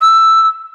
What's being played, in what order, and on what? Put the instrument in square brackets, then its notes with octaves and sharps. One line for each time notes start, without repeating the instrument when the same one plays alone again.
[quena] E6